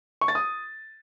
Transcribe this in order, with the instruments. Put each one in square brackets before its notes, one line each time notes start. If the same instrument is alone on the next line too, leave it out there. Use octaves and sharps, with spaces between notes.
[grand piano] C#6
A6
D#6